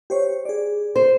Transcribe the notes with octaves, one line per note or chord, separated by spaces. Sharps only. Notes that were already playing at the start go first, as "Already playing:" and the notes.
G4 C5 C#5
G#4 D5
C5